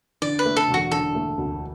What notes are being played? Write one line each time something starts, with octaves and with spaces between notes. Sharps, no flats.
D3 D5
B4
A3
A4
E1
F#4
D3 A4
A3
D2